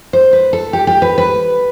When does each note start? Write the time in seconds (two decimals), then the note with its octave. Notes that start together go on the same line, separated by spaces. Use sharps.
0.13 C5
0.33 B4
0.53 A4
0.73 G4
0.87 G4
1.02 B4
1.18 B4